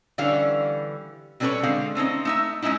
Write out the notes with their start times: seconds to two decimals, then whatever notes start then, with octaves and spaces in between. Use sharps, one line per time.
0.18 D3 E3 G3 C#4 F5
1.40 C3 G3 C#4 A4 B4 C#5
1.63 D3 G#3 C4 F5
1.95 A3 C4 C#4 D#4
2.25 A3 D#4 E5
2.62 G#3 C4 C#4 D#4 E4